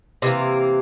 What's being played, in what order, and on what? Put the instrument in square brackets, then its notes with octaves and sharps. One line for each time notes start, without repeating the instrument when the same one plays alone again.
[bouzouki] C3 E3 A#3